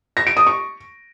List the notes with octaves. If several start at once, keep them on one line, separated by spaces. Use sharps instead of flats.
A#6
D7
D#6
C#6